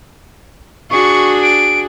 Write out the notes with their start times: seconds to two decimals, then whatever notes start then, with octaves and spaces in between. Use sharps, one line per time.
0.91 D4 F#4 G#4 C#6
1.43 D7